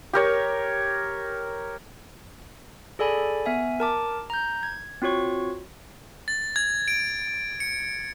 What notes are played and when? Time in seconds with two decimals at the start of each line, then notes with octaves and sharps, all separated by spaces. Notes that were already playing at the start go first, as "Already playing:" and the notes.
0.13 G4 A#4 C#5
2.99 G#4 A4 D5 G#5 B5
3.46 B3 E5 G#5
3.80 A#4 A5 D6
4.30 A#5 G6
4.63 G#6
5.02 C4 F4 F#4 C#5 C#6
6.28 A6
6.56 G#6
6.88 D7
7.60 C#7